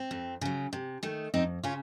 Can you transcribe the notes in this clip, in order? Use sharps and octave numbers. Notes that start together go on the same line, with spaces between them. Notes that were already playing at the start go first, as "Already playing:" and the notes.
Already playing: C4
F2
C#3 F#3
C3
D#3 A3
F2 C4 D#4
C#3 C#4 F4